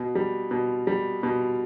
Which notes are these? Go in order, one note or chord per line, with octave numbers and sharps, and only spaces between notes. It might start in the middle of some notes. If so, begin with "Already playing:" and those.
Already playing: B2
G3
B2
G3
B2